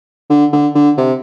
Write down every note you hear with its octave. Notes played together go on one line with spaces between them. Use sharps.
D3
D3
D3
C3